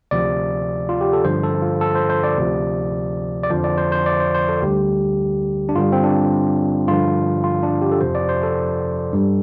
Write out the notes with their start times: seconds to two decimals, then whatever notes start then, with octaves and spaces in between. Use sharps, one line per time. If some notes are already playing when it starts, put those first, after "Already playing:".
0.11 D2 C3 F3 D5
0.89 F4
1.01 G4
1.13 A4
1.25 G2 D3 F3 C5
1.43 A4
1.62 F4
1.81 A4
1.95 C5
2.10 C5
2.23 D5
2.37 D2 C3 F3
3.43 D5
3.50 F2 D3 F3 C5
3.64 D5
3.78 C5
3.92 C5
4.06 D5
4.20 C5
4.34 C5
4.49 A4
4.62 D2 D3 G3 G4
5.69 D4
5.75 G2 D3 G3 F4
5.92 C4
6.04 D4
6.88 G2 D3 F3 F4
7.44 F4
7.63 D4
7.82 G4
7.92 A4
8.01 F2 C3 F3 C5
8.15 D5
8.29 C5
8.43 A4
9.13 G2 G3